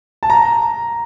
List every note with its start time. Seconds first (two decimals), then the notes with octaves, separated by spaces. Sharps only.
0.23 A5
0.30 A#5